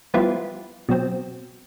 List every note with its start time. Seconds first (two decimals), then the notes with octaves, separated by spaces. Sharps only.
0.14 F3 G3 B3 E4 F4 G4
0.89 B2 F#3 C4